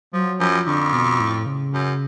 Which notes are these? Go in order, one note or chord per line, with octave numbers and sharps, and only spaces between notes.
F3 F#3
F#2 F3
F2 D3
B2
A2
C#3
F#2